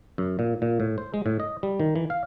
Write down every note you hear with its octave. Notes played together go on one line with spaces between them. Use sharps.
F#2
A#2
A#2
A2
C5
G#3
A2
D#5
G3
D#3
E3
F5